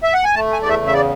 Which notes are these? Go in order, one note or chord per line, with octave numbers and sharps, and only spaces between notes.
E5
F#5
G#5
A3 A5
G#5
E2 D5
E5
C#3
E5
D5